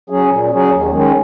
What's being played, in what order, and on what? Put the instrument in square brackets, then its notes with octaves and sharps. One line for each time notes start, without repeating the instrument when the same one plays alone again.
[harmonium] F#3 C#4 G#4
A#2
F#3 C#4 G#4
D#2
D#3 G#3 C#4